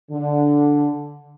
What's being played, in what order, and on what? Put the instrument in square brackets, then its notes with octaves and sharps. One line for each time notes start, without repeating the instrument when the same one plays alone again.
[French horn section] D3